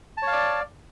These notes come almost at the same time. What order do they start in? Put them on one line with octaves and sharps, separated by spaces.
A5 C#5 F5 D5